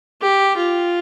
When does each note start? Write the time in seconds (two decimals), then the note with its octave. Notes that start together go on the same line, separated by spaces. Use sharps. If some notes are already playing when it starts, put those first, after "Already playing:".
0.22 G4
0.57 F4